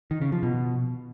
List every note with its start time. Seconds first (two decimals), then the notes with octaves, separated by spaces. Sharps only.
0.11 D#3
0.22 C#3
0.32 F3
0.43 B2